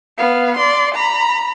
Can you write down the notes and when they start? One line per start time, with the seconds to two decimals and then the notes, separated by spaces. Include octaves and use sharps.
0.18 B3 F5
0.57 D5 C6
0.94 A#5 B5